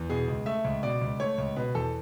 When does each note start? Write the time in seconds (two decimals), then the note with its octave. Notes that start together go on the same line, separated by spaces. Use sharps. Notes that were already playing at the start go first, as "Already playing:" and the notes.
Already playing: E2
0.10 B2 G#4
0.28 C#2
0.46 A3 E5
0.65 C#2
0.83 B2 D5
1.01 C#2
1.20 A3 C#5
1.38 C#2
1.56 B2 B4
1.75 E2 A4